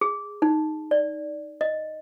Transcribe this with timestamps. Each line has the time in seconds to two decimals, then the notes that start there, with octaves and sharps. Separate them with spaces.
0.01 G#4
0.42 D#4
0.91 D5
1.61 D#5